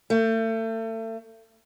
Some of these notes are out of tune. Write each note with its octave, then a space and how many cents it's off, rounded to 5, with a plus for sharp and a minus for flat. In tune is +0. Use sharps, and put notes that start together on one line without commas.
A3 +35